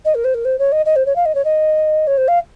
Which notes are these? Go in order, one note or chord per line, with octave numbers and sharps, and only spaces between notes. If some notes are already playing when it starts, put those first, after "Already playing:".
D#5
A#4
C5
A#4
C5
C#5
D#5
D#5
C5
C#5
F5
D#5
C#5
D#5
C#5
C5
F5